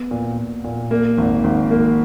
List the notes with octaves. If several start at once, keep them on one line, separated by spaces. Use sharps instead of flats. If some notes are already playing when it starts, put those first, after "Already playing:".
Already playing: B3
A#2
A#2
A#2
A#3
G#1
G#1
A#3